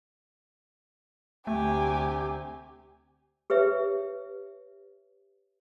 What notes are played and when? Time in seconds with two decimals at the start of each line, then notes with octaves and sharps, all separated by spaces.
1.47 D2 C3 A3 G4 G#5
3.50 G4 B4 C#5 E5